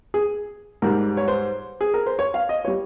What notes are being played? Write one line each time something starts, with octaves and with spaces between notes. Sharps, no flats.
G#4
G#2 G3 A#4
C#5
C5
G#4
A#4
C5
C#5
F5
D#5
C#5
G3